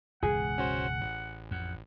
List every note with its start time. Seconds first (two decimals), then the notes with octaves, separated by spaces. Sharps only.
0.23 E1 C#2 G#2 G#4 F#5
0.58 C#4 F#4 C5
1.01 A1
1.51 F2 F#5